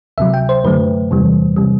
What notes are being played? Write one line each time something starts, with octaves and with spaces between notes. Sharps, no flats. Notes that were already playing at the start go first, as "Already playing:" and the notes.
D2 C3 F#3 E5
G5
C5
F#2 D3 F#3 A3 B4
E2 C3 E3 G3
C3 G3